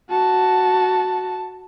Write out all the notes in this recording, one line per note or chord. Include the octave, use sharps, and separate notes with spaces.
F#4 A5